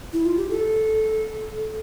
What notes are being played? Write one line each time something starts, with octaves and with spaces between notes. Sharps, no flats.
E4
F4
G4
A4